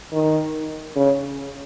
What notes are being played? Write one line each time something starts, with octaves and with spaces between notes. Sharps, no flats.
D#3
C#3